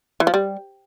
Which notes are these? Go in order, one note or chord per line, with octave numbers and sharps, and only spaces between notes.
E3
F3
G3